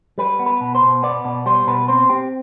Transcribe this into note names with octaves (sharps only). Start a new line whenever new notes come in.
G3 B4
B3
B4
B2
C5
B2
B3 D5
B2 D5
G3 C5
B2 B4
C4 C5
C4 G4